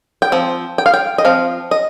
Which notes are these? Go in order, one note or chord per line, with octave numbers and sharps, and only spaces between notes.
G5
F3 C4
G5
F5
G5
D#5
F3 C4 F5
D#5